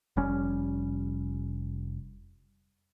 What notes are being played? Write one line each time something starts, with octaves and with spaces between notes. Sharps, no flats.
F1 G3 C#4